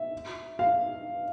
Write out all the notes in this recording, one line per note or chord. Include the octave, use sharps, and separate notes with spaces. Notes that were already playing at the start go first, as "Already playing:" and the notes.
Already playing: E5
F5